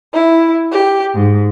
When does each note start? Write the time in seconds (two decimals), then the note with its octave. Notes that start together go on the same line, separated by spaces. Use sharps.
0.12 E4
0.70 G4
1.14 G#2